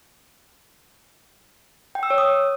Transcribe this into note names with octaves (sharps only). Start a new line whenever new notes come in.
G5
E6
C#5
D#6